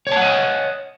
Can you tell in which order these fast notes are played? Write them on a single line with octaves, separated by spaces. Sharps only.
C#5 A5 F#5 D#5